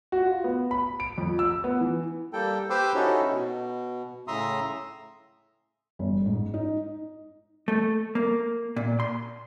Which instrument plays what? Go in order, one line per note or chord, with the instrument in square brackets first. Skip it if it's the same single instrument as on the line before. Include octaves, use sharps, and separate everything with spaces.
[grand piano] F#4
F4
B3
B5
D7
F2
E6
B3
E3
[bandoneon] G3 A#3 A4 G5
G4 B4 C5 C6 D6 E6
C#4 D#4 E4 F#4 A4 C#5
B2
A2 C#3 E5 A#5 C6 D#6
[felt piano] G1
G#2
D#4
[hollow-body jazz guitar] A3
A#3
A#2
C6